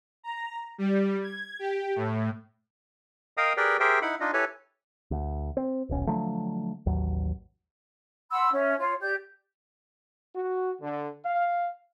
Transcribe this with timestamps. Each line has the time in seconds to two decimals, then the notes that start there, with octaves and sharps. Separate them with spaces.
0.23 A#5
0.78 G3
1.23 G#6
1.59 G4
1.96 A2
3.37 A#4 D#5 F5 G5 A#5 D#6
3.57 G4 G#4 A#4 B4 D5 G5
3.80 G4 G#4 A#4 C5 E5 G5
4.02 D#4 E4 F#5 B5
4.20 D4 D#4 F4 D#5
4.33 E4 G4 A4 B4 C#5 G#5
5.11 D2
5.57 C4
5.89 D#1 B1 C#4
6.07 D3 F3 F#3 A3
6.86 A1 D#2 F#3
8.30 F#5 B5 C6 E6
8.51 C#4 E5
8.78 F4 C#5
9.01 G4 D5 G6
10.35 F#4
10.82 D3
11.26 F5